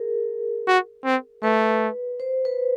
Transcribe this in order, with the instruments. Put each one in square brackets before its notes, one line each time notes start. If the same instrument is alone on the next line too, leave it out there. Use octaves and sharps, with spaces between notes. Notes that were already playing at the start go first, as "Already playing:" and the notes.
Already playing: [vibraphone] G#4 A#4
[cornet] F#4
C4
[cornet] A3 [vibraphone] B4
[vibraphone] C5
B4